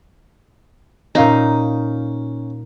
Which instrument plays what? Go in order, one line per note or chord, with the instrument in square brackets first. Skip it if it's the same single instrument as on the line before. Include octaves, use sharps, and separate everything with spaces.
[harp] A#2 F5 A#5 [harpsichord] C#4 [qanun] D#4